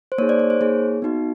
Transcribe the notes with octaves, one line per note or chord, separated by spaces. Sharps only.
C5
A#3 D#4 G#4 C#5
C5 D5
C#5
C5
A#3 D#4 G#4 C#5
B3 D#4 F#4